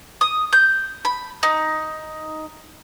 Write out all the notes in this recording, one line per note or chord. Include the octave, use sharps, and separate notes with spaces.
D#6
G6
B5
D#4